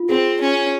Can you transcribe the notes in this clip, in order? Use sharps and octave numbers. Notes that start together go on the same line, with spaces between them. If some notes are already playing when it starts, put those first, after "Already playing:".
Already playing: F4
C4 G#4
C#4